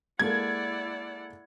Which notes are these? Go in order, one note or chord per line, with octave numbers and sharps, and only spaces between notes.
G#3 A#3 E4 A4 D5 F#5 G#6